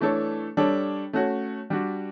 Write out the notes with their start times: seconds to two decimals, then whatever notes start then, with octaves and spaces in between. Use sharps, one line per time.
0.01 E3 A3 D4 A4 C#5
0.57 G3 D4 A4 C#5
1.13 A3 C#4 F#4 C#5
1.70 G3 D4 F#4